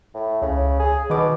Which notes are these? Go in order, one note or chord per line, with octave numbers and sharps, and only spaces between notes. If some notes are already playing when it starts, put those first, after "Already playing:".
A2
C#2 C#3
G#4
B2 D#3 D6